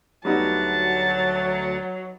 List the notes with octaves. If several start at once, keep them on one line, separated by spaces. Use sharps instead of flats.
D2 F#3 G3 B3 D#4 F#5 A5